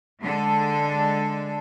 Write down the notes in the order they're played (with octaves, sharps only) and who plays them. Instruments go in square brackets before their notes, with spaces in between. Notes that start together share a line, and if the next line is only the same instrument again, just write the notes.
[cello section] D3 G#3 D4 A4